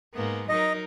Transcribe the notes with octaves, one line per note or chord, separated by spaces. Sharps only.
G#2 A#3 B3
F#3 D#4 A#4 D#5